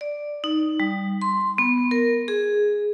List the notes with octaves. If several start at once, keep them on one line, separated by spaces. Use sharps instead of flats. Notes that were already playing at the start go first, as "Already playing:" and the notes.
D5
D#4
G3
C6
B3
A#4
G#4